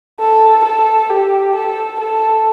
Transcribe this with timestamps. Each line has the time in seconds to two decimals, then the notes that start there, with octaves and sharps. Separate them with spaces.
0.20 A4
0.64 A4
1.09 G4
1.55 A4
2.00 A4